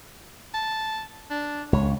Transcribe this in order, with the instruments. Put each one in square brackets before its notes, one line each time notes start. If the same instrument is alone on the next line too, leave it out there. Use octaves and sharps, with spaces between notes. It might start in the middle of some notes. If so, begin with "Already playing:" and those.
[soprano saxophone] A5
D4
[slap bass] C#2 [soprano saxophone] C#5